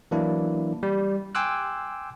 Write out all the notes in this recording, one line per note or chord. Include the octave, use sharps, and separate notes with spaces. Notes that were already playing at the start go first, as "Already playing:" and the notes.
E3 F#3 A#3 D4 E4
G3
G5 G#5 C6 D6 E6 F#6